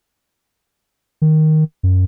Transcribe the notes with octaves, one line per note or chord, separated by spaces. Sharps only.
D#3
F#2